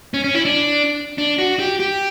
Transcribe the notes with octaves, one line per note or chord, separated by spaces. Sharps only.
C#4
C#4
E4
D4
D4
F#4
G4
G4